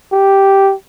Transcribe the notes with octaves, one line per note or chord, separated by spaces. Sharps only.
G4